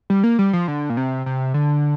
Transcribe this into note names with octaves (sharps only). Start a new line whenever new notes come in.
G3
A#3
G3
F3
D3
A#2
C3
C3
D3